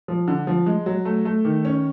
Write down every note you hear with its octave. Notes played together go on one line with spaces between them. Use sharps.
F3
D3
F3
G#3
F#3
A3
A3
D#3
C#4